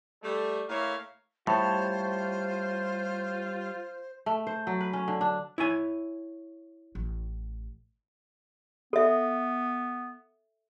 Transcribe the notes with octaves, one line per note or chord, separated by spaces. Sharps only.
G3 A3
A2 A#3 E4 C#5 F5
A2 G3 F4 C5 C#5 A5
A3
C5
F#3
B4
C#4
D3
D4
E4 C#5 G#5
A1
B3 A4 E5